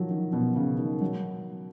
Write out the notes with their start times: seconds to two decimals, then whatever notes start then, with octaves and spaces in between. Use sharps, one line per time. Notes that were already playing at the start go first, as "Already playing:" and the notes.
Already playing: D#3 F3 F#3
0.10 D#3
0.33 B2
0.56 C#3
0.79 D#3
1.01 F#3